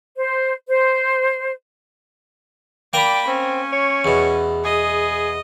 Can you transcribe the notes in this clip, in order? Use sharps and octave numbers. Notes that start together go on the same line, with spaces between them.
C5
C5
A#3 A#4 D5 G5 A#5 B5
C4 C#4
C#5
E2 B2
G#4 D#5